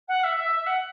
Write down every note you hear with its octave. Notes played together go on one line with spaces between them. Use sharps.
F#5
E5
E5
E5
F#5